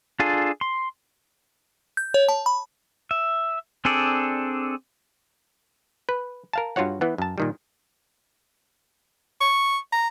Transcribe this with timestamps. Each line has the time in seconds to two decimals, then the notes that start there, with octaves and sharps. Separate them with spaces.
0.20 D4 F4 G#4 A4
0.61 C6
1.97 G6
2.14 C#5
2.29 A5
2.46 B5
3.11 E5
3.85 C4 D4 G#4 A4 D5
6.09 B4
6.53 A#4 F5 A5
6.76 G2 F4 F#4 C#5 F#5
7.01 E3 B3
7.18 F#2 A5
7.38 A#2 D#3 G3
9.41 C#6
9.92 A#5